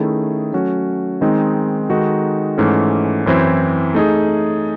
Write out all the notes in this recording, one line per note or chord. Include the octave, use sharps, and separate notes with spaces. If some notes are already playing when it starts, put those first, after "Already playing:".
Already playing: D#3 A3 C#4 E4 G#4
F#3 A3 C#4 F#4
D#3 G#3 C4 D#4
D#3 G#3 D#4 F#4 A4
G#2 E3 A3 C#4
F#2 E3 C4 E4 C5
A3 D#4 G#4